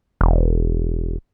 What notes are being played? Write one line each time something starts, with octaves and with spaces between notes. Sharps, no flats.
E1